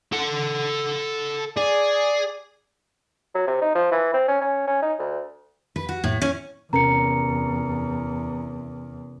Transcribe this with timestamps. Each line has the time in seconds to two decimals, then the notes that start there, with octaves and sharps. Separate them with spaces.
0.12 A4 F#5
1.57 G#4 D5
3.35 F#3
3.47 C3
3.61 D#4
3.75 F3
3.92 E3
4.14 C4
4.28 C#4
4.41 C#4
4.67 C#4
4.82 D#4
4.99 D2
5.76 B4
5.89 F#4
6.04 A2
6.22 C#4
6.73 E2 C3 C#4 A#4 A#5 C#7